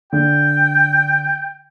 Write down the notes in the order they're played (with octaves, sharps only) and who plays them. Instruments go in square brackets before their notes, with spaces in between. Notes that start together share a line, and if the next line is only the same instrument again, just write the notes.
[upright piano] D3 [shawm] G5